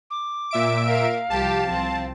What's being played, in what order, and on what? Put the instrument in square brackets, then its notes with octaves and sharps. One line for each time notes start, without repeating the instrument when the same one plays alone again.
[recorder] D6
[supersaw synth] A#2 E5 D7
[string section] A#4 [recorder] F5
[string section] C2 F3 G4 [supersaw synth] A5
[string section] C2 F3 C4